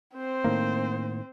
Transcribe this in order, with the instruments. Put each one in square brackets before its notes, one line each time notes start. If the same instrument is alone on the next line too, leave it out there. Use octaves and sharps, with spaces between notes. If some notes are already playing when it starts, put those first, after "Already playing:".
[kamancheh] C4 C5
[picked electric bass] A2 D#3 A#3